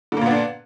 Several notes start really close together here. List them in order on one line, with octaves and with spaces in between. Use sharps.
D3 A#3 A#2 B3 D4